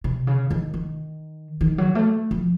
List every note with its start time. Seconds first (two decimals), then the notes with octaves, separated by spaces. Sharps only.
0.04 C3
0.27 C#3
0.51 D#3
0.74 D#3
1.61 D#3
1.78 F#3
1.95 A3
2.31 F3